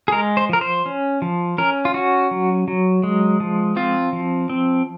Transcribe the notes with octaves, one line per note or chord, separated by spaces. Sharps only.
G#4
G#3 A#4
C5
F3 A#4
C5
C#4
F3
C#4 A#4
F4
C#4 F#4
F#3
F#3
G#3
F3
C4 F4
F3
C4